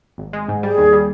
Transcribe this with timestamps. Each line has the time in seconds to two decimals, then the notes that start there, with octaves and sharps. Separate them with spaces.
0.18 G#1
0.33 G#3
0.49 G#2
0.63 G3 G#4
0.78 D#2
0.93 G3